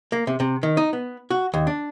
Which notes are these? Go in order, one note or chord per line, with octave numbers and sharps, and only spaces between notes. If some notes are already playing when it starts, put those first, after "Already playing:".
A#3
C3
C3
D#3
D#4
B3
F#4
D#2
D4